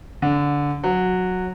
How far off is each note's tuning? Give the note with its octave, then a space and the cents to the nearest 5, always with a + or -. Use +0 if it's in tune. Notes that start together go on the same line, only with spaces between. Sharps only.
D3 -20
F#3 -10